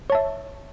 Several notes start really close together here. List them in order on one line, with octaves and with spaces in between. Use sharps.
C#5 A5 E5